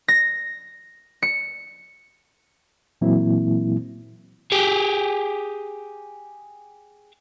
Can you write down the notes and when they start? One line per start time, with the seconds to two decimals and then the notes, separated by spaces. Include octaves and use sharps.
0.08 A#6
1.23 C#7
3.01 A#2 E3 F#3 A#3 C4 E4
4.52 G4 G#4